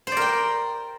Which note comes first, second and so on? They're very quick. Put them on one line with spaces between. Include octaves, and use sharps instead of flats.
C5 D5 A#4 G5